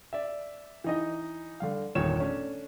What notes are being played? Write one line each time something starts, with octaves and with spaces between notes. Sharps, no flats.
D5 E5
E3 D#4 D#5
D3 G3 F5
G1 E2 A#2 D#3 C#5 E7
A3 C#4 D4